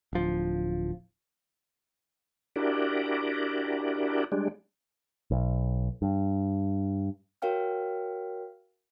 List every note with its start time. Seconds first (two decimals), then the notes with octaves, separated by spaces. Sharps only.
0.13 D1 F3
2.56 D4 E4 F#4 G4 A#4 D5
4.32 G3 G#3 D4
5.31 B1
6.02 G2
7.42 F#4 A#4 C#5 F5 G5 F6